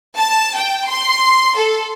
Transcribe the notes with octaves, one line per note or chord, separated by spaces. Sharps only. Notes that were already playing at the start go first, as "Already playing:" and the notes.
A5
G5
C6
A4